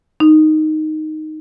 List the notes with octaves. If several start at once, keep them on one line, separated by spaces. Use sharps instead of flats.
D#4